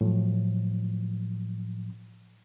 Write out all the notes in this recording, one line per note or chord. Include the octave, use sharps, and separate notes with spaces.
A2 F3 F#3